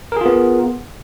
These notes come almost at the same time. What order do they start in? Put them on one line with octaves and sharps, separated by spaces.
A#4 G#4 F4 B3